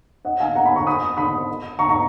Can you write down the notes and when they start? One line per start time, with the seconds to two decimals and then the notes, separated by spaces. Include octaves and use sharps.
0.25 D#5 F#5
0.40 F5 G#5
0.56 F#5 A#5
0.65 G#5 B5
0.76 A#5 C#6
0.87 B5 D#6
1.17 B5 D#6
1.79 A#5 C#6
1.89 A#5 C#6